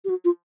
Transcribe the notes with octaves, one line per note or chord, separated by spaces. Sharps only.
G4
F#4
F4